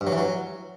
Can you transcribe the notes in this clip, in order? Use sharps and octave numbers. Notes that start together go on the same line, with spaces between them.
G2
F#3
E3
F#3